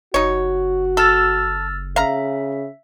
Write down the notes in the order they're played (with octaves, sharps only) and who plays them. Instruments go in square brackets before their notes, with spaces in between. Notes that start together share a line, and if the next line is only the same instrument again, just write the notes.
[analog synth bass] F#1 [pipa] D#4 C#5 [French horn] F#4
[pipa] A4 [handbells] E6 F6 A6
[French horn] C#3 [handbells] E5 [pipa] F5 A#5